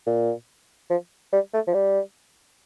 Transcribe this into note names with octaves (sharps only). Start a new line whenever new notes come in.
A#2
F3
G3
A3
F3
G3